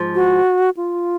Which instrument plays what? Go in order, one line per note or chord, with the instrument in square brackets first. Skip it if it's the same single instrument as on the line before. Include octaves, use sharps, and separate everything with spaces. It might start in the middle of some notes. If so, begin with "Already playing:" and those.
Already playing: [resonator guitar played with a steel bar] G#2 F3
[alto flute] F#4
F4